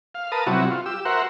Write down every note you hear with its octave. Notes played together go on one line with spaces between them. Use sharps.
F5
A#4 B4 A5 D#6
C3 F#3 G3 E4 F#4
F4
G4 E6
F#4 A#4 C5 E5 F#5